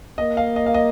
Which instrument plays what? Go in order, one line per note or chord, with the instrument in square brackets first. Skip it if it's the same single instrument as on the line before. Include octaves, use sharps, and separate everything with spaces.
[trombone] A#3 [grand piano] D#5
[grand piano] F5
D#5
F5
D#5